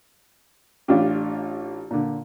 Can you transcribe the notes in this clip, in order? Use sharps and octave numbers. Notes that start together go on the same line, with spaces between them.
A1 D4 F4 G4
A#2 D3